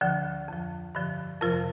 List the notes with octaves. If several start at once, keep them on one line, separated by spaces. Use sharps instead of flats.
D2 D3 F3
F2 F3
G2 D3 F3
F2 C3 F3 F4 A#4